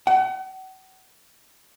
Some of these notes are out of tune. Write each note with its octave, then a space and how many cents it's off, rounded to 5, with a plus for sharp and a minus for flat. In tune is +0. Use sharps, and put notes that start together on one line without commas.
F#5 +40